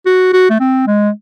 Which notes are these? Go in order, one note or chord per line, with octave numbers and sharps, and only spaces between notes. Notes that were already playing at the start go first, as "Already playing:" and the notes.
F#4
F#4
A3
C4
G#3